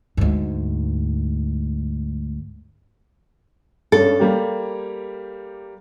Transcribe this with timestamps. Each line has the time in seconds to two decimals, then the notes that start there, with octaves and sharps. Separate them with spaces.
0.17 D2 G#2
3.92 G2 C#4 A4
4.20 G3 A#3 G4